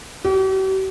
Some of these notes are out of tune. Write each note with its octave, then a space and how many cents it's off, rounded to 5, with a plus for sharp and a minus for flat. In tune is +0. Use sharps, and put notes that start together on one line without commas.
G4 -45